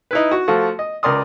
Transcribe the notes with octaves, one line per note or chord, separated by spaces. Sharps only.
D#4 E4 B4
F#4
F3 A3 F4 F#4 A4
D#5
C#2 A#4 D5 C6 D#6